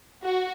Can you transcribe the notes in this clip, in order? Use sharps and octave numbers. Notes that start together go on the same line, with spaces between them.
F#4